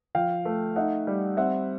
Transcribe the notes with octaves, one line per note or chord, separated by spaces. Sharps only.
F3 F5 G5
A3
D#4 E5 F#5
G3
C4 E5 F#5